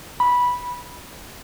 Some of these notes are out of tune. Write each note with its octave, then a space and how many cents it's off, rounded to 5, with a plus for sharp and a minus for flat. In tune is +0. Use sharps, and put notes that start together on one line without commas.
B5 -10